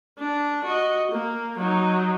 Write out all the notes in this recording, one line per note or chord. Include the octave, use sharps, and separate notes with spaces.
D4
F#4 D#5
A#3
F#3 D#4